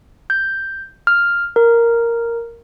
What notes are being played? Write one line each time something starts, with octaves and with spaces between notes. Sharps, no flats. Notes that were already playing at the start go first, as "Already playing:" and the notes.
G6
F6
A#4